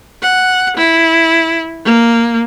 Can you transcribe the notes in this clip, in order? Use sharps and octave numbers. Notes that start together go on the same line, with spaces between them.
F#5
E4
A#3